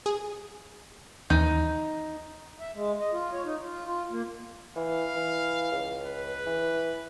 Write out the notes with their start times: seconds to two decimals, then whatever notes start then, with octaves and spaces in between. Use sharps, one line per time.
0.06 G#4
1.30 D#2 E3 D#4
2.60 E5
2.75 G#3
3.01 D#5
3.12 F4
3.33 C#5
3.45 D#4
3.62 F4
3.85 F4
4.11 A#3
4.76 E3 F5
5.16 E3
5.72 C#2
6.06 B4
6.47 E3